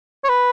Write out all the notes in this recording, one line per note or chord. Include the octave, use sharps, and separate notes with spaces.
C#5
B4